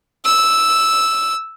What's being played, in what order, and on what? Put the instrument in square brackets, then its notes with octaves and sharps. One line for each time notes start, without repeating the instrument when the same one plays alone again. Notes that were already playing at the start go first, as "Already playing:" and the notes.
[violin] E6